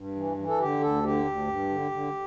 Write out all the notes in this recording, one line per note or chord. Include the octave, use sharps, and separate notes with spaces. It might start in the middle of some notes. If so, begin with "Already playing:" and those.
Already playing: G2
E3
E3
A4
D3 G4
D2 A4
D3 G4
D2
G2
D3
D3